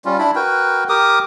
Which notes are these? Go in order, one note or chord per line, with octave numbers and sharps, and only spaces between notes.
G3 C#4 F4
D4 E4 B5
F#4 A#4 B4 G5
G4 A#4 D6 D#6